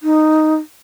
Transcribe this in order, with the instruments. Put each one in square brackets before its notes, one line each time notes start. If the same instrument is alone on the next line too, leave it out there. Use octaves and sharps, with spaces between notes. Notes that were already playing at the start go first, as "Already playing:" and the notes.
[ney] D#4